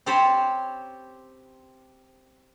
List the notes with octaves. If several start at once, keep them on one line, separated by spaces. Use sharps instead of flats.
C4 G4 C5 C#5 A5 B5